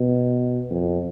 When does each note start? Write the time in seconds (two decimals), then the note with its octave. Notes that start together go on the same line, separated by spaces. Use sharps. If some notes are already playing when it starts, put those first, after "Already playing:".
Already playing: B2
0.70 F2